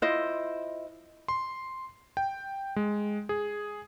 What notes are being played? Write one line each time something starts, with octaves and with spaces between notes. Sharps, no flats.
E4 F4 C5 D#5
C6
G5
G#3
G#4